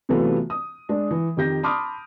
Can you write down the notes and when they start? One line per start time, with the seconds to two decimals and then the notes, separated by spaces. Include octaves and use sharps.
0.09 C3 E3 F#3 A3 B3 F4
0.50 D#6
0.89 G#3 D4
1.11 E3
1.37 F2 D#3 G4 G6 A#6
1.63 A5 B5 C6 D6 D#6 F6